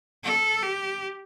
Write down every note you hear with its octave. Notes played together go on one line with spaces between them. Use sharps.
A4
G4